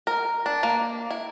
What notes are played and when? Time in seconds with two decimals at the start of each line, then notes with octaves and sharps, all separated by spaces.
0.07 A#4
0.46 D4
0.63 A#3
1.11 E4